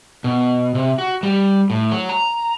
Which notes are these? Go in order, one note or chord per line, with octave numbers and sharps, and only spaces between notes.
B2
C3
F#4
G3
A2
F#3
A#5